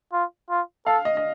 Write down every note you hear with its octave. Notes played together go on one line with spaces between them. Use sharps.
F4
F4
A4 F5
D#5
D#5